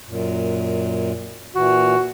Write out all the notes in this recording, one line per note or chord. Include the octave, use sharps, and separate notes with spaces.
F#2 A#2
A#2 E3 F#4